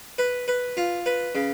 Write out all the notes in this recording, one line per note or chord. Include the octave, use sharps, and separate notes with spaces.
B4
B4
F4
B4
C#3